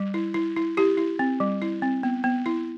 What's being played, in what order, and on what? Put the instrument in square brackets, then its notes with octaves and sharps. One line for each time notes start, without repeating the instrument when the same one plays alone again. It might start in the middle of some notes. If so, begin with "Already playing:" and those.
Already playing: [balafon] G3
E4
E4
E4
E4 G4
E4
C4
G3
E4
C4
B3
B3
E4